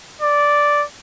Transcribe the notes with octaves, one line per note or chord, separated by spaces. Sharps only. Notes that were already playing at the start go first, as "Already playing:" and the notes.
D5